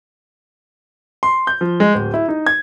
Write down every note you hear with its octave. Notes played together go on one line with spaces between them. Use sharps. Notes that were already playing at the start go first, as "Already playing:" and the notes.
C6
G6
F3
G#3
D1
E4
D#4
G#6